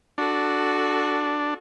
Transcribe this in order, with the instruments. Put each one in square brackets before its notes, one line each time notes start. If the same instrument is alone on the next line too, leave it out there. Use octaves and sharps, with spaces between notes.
[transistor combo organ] D4 [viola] F#4 A4